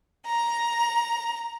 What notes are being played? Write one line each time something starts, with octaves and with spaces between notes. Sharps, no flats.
A#5